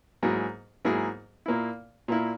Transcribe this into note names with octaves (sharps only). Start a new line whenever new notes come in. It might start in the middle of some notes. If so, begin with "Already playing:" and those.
G#2 F#3 A#3 E4 G#4
G#2 F#3 A#3 E4 G#4
A#2 A#3 E4
A#2 A#3 E4